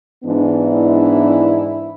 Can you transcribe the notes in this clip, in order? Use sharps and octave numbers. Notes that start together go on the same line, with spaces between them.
G#2 E3 B3 D4
E4